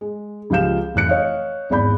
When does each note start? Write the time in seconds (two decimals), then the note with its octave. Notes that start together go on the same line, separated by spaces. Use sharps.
0.01 G#3
0.50 C#2 F3 G4 F5 G6 E7
0.95 F1 E3 F#6 C#7
1.09 C#5 D#5 F5
1.70 G#1 E2 D5 B5 G6